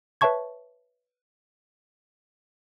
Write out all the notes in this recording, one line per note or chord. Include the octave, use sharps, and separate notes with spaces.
B4 C#5 E5 A5 C#6 G#6